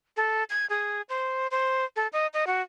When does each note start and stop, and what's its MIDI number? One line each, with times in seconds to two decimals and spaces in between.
0.17 0.44 69
0.50 0.66 92
0.70 1.02 68
1.09 1.47 72
1.51 1.85 72
1.96 2.07 69
2.13 2.27 75
2.34 2.45 75
2.47 2.62 66